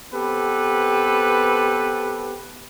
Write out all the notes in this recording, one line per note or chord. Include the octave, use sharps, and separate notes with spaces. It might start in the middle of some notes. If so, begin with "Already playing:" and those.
B3 C4 G4 A4 B4